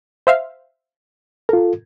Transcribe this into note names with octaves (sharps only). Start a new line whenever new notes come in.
C5 E5 F5
F4 A4 A#4